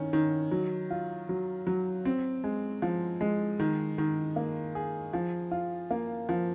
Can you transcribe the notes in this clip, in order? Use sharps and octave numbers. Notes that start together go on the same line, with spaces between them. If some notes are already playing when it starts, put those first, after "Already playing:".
Already playing: D#3 C#4
D#3
F#3
F4
F#3
F#3
C4
G#3
F3
G#3
D#3
D#3
A#3
G#4
F3
F4
A#3
F3